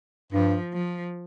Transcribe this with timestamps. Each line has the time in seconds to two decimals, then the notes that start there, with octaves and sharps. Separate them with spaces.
0.33 G2 F3
0.74 F3